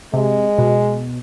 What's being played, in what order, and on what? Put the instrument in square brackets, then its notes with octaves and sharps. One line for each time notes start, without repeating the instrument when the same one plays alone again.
[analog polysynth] C3 [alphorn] G#3
[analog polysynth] B2